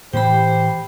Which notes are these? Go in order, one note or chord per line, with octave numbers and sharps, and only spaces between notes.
A2 E3 A3 G4 C5 G5 B5